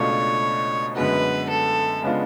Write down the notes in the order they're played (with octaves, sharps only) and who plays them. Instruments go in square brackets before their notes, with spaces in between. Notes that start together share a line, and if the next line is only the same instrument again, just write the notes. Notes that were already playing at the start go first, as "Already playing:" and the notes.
Already playing: [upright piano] C#2 B2 A3 D4 F4 [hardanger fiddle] C#5
[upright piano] F#2 D3 G#3 B3 F#4 [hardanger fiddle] B4
[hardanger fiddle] A4
[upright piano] C#3 G#3 B3 D4 F4